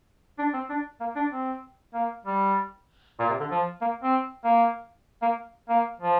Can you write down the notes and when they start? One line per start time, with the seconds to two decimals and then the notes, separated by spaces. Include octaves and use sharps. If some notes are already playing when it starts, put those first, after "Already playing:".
0.38 D4
0.53 C4
0.70 D4
1.00 A#3
1.16 D4
1.32 C4
1.94 A#3
2.25 G3
3.20 A#2
3.30 C3
3.40 D3
3.51 F3
3.81 A#3
4.03 C4
4.44 A#3
5.22 A#3
5.69 A#3
6.00 F3